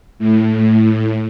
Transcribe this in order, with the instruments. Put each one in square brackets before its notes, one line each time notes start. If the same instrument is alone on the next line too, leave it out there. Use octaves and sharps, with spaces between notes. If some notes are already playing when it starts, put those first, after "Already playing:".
[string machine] A2